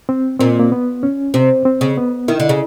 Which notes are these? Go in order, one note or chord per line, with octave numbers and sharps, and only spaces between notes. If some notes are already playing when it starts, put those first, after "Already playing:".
C4
A#2 C4
A#3
B3
C#4
C3 C4
C4
C#3
B3
D#3 E4
D3
C#3